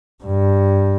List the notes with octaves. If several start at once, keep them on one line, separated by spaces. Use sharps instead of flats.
G2